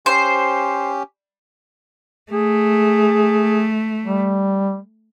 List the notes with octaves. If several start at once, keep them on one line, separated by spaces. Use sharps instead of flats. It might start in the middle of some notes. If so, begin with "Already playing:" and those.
C#4 G4 C5
A3 G#4
G3